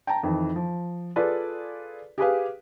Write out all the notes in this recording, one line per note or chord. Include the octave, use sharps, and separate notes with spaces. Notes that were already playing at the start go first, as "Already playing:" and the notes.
G5 A5 A#5
F2 D#3 E3
F3
F4 G#4 A4 B4 D5
G4 G#4 B4 F5